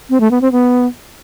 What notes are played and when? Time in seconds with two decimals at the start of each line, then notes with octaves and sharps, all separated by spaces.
0.10 C4
0.20 A3
0.31 B3
0.41 C4
0.52 B3